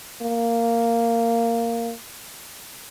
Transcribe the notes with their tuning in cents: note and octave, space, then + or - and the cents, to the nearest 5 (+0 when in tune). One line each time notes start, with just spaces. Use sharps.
A#3 -10